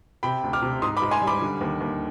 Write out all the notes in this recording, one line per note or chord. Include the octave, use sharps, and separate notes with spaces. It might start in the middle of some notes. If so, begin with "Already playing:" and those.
C3 G5 B5
D2
D6 F6
C3
G#2 C6 D#6
B5 D6
G#2
G#5 C6
G3
B5 D6
D3
D#2
D#2